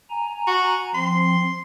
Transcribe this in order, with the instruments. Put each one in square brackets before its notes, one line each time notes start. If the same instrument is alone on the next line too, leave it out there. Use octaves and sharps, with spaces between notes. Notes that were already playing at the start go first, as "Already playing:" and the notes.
[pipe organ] G#5 A#5
[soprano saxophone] F#4
[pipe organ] F3 C4 [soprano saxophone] C6